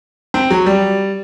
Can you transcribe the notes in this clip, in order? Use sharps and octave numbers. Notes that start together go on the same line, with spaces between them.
C4
F#3
G3